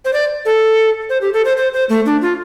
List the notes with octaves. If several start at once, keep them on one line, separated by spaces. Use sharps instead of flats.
C5
D5
A4
C5
G4
A4
C5
C5
C5
A3
D4
F4